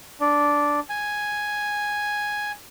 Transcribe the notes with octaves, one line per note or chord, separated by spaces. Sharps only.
D4
G#5